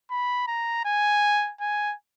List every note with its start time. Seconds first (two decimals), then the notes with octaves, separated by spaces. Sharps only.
0.11 B5
0.47 A#5
0.85 G#5
1.61 G#5